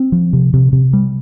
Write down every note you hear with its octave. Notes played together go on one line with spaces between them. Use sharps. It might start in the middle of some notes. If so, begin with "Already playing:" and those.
Already playing: C4
F3
C3
C3
C3
G3